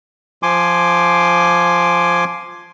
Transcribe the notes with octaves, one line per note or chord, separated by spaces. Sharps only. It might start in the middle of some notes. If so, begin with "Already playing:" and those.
F3 G#5 C6 D6